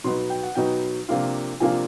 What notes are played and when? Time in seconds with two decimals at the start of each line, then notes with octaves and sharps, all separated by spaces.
0.04 B2 F#3 B3 D#4 C6
0.30 G5
0.43 F#5
0.55 B2 F#3 B3 D#4 G5
1.09 C3 F3 A#3 D4 F4
1.60 C3 F3 A#3 D4 F4 G#5